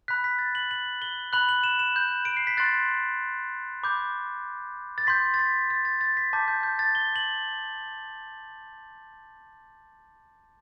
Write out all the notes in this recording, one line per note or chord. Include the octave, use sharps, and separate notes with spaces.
B5 F#6 B6
B6
A6
F#7
F#7
G7
B5 F#6 F#7
F#7
E7
E7
G6
D7
C7
B6
C6 F#6 A6
B5 D6 G6
A6
C6 G6 B6
A6
B6
A6
A6
A6
B6
A5 D6 G6 B6
G6
G6
A6
G7
F#7